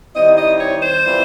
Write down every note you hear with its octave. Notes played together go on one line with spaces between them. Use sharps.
D#3 G3 C4 E4 D#5
D#5
C#5
C5
E3 G3 C4 F4